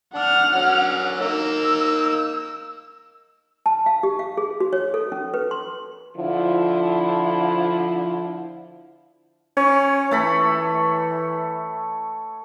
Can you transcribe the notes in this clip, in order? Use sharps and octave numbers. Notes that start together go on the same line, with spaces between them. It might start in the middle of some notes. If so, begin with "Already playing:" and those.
D4 F#5 F6
D3 F#3 C#4
A#3 D#4 E6
A5
F5
G4
F5
G#4
F#4
C#5
A4
C#4
B4
C6
D3 F3 E4
C#4 C#5
E3 A3 A4 B5